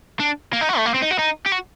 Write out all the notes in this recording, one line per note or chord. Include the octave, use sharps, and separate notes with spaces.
D4
A#3
D#4
F#4
A3
A#3
C4
D#4
F#4
D#4
G4
F#4